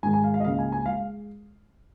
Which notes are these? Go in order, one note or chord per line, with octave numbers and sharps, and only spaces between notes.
G#2 D#3 G#3 G#5
G#5
F5
F5
D#5
C#2 C#3 A#3 F5
G#5
G#5
G#3 F5